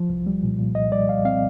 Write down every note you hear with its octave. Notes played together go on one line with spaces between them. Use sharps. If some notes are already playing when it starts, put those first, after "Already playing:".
Already playing: F3
C2
G3
A#2
A#2
C2 D#5
G3 D5
G3 F5
C4 F5